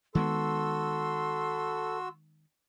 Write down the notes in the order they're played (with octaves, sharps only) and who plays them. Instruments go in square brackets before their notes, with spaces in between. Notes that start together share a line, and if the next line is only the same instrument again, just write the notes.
[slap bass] D#3 G#3 B3 [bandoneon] F#4 E6 [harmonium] A4 [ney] C6